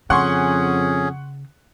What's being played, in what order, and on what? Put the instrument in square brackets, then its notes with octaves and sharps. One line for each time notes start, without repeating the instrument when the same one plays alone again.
[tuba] F2 [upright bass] C#3 [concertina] C#4 G#4 [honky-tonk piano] F#5 C6 C#6